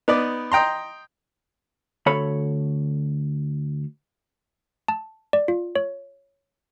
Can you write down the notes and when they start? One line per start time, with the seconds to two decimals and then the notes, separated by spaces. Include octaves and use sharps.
0.08 B3 D#4 B4 D5
0.52 D#5 G5 A#5 C6
2.06 D2 A4 C#5 B5
4.88 A5
5.33 D5
5.48 F4
5.76 C#5